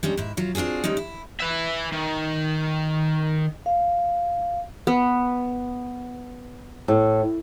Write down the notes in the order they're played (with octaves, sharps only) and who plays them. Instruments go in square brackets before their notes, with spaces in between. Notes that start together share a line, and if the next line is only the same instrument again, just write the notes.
[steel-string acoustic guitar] G3 G#3 C#4 D4
G#2 E4
F#3 F4
C4 D4 F4 F#4 G#4
G3 G#3 C#4 D#4
E4
[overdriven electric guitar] B4 E5
D#3
[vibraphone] F5
[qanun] B3
[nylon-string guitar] A2